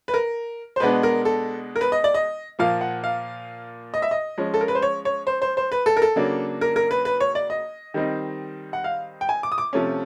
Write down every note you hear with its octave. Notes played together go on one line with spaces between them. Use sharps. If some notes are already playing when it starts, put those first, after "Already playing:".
B4
A#4
C5
B2 G#3 B3 D4 B4
A#4
A4
A#4
B4
D#5
D5
D#5
A#2 F3 A#3 F5
F#5
F5
D#5
E5
D#5
F3 G#3 C#4
A4
A#4
B4
C5
C#5
C#5
C5
C5
C5
B4
A4
A#4
A4
C#3 F#3 A#3 D4
A#4
A#4
B4
B4
C#5
D5
D#5
D#3 G3 C4 D#4
F#5
F5
G5
G#5
D6
D#6
D6
C3 F3 A3 C#4